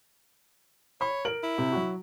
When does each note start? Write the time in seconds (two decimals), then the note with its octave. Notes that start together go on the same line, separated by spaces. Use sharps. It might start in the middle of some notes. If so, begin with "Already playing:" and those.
1.01 C#5 B5
1.25 A#4 D7 F#7
1.43 E4
1.58 C3
1.72 F#3 F#4